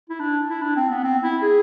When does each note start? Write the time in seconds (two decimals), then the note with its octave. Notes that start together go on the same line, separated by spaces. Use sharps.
0.09 E4
0.20 D4
0.49 E4
0.62 D4
0.76 C4
0.90 B3
1.04 C4
1.23 E4
1.42 G#4